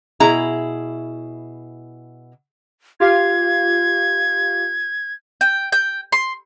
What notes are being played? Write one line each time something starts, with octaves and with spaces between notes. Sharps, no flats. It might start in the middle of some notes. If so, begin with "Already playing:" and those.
B2 E4 G#4 A#5
F4 G4 F5 G#6
G5
G5
C6